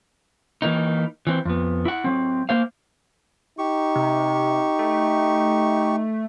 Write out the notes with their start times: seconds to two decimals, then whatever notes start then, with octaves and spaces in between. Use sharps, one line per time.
0.62 E3 A#3 D#4
1.27 E3 C4
1.45 F2 B3
1.85 E4 F#5
2.04 F#3 C4
2.49 A#3 C5 F5
3.58 D#4 G4 C#6
3.96 C3
4.79 A3